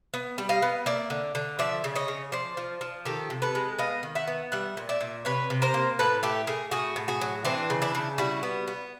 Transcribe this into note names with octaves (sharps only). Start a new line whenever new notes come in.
B3
G3
D#5 F5
B3
A#3 D5 E5
D3
D3
F3 D5 E5
C#3
C#5 D#5
C#3
F3 C5 D5
F3
F3
D#3 G4 A4
C3
A4 B4
G#3
B3 D#5 F5
D#3
E5 F#5
B3
G3 E5 F#5
A#2
D5 E5
A#2
C3 B4 C#5
C3
A#4 C5
A#3
A2 A4 B4
A3 G4 A4
A3 G#4 A#4
A2 F#4 G#4
A2
F#4 G#4
F#3
E3 C4 D4
C#3
D4 E4
C#3
G3 E4 F#4
B3
B3